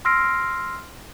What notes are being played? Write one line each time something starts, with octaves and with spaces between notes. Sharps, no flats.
C6 E6 F6 A#6 C7 D7